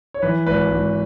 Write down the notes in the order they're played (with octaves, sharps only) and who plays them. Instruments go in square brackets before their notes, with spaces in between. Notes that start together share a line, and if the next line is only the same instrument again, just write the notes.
[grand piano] C#5
E3 B4
G#1 B4
G#1